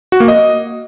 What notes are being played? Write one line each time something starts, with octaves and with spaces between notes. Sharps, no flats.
F#4
A#3
D#5